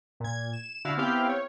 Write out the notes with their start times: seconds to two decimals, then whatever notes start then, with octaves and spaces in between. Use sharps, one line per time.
0.20 A#2 G#6
0.53 E7
0.85 D3 E4 F#4 F5
0.97 B3 C4 E4 G4 F5 G5
1.29 C#5